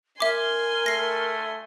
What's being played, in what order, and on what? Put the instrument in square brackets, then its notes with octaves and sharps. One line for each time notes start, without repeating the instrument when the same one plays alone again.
[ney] A#4 [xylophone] E5 D6 [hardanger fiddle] G#5 C6
[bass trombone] A3 [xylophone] A#6 C7